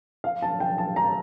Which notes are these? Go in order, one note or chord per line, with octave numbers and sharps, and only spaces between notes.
F5
A5
G5
A5
A#5